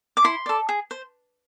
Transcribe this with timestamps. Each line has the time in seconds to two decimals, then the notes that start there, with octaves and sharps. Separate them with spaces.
0.17 D6
0.24 E4 C6
0.46 A4 D5
0.69 G#4
0.91 C5